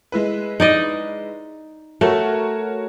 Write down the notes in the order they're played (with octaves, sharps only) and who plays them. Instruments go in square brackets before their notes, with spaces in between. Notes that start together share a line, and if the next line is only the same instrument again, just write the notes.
[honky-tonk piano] G#3 E4 B4
[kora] D#4 D5 D#5
[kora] A3 [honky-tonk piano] F#4 A#4 C#5